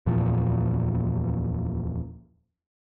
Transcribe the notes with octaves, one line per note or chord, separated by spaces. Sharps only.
D1 E2 A#2 F3